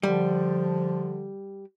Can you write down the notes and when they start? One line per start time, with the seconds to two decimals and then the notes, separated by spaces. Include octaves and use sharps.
0.03 D3 F3 G3